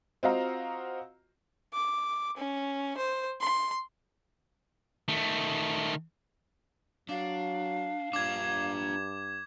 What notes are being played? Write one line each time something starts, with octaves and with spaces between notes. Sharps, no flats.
C4 F4 F#4 D#5 F5 A#5
D6
C#4
C5
C6
D#3 A3
F#3 D4 F5
G2 D4 F4 D6 G#6